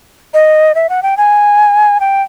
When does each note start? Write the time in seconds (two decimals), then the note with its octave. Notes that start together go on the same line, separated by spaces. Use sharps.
0.34 D#5
0.75 E5
0.89 F#5
1.03 G5
1.17 G#5
2.00 G5